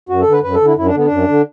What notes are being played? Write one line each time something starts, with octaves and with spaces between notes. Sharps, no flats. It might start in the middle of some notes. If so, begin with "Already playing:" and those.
F#2 F#4
A4
D3
B4
F#2 B4
A4
D3
E4
F#2 E4
D4
D3 B3
D4
F#2
D3